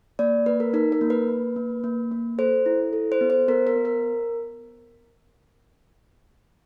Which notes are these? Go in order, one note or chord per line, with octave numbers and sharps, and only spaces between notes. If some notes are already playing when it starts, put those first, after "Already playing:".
A#3 D5
A#3 B4
A#4
D#4 A#4
A#4
A#3
B4
A#3
A#3
A#3
A#3
A4 C5
E4
A4
C5
B3
C5
B3 A#4
A#4
B3
A#4